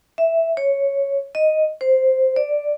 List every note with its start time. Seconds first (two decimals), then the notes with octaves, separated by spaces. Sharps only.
0.18 E5
0.57 C#5
1.35 D#5
1.81 C5
2.36 D5